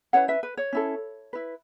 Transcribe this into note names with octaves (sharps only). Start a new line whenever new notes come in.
C#4 E4 B4 C#5 F#5
B4 E5
B4
C#5
C#4 E4 A4
E4 B4